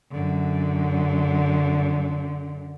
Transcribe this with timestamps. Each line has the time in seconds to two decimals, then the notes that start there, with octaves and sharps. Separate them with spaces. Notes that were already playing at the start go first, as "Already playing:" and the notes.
0.12 F#2 D3